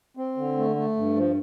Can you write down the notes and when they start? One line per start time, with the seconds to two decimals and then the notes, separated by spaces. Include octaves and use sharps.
0.17 C4
0.37 D3
0.57 A3
0.76 A3
0.96 G2
1.16 F3